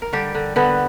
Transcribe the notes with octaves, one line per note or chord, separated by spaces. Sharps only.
A#4
D3 G3 G4
D3
D3 B3 B4